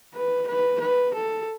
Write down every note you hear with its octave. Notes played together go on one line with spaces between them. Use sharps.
B4
B4
B4
A4